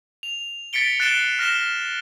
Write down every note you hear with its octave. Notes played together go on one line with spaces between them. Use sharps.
F7
A6 B6 C#7 D7 G7
F#6 A6 C7 D7 E7 G7
F6 A#6 E7 G7